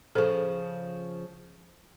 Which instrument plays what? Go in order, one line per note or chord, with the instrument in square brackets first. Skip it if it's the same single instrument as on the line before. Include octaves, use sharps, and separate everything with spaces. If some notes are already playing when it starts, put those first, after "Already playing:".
[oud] C#3 F3 [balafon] A4 C5